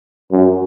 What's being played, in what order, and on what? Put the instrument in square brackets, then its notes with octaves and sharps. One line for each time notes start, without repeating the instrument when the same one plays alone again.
[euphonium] F#2